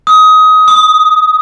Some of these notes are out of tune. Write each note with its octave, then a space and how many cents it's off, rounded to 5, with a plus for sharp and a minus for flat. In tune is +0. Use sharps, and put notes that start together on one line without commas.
D#6 +20
D#6 -5